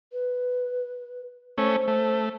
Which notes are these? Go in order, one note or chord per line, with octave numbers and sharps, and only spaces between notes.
B4
A3 C#4 C5
A3